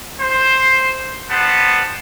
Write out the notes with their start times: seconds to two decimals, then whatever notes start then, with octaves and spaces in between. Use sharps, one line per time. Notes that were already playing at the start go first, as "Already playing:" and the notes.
0.20 C5
1.30 G3 B3 C5 F#5 A5